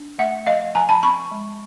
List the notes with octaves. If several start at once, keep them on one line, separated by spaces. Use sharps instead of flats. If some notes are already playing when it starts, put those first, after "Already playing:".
Already playing: D4
A3 E5 F#5
F3 D#5 F5
F3 G#5 A#5
A5 B5
C4 B5 C#6
G#3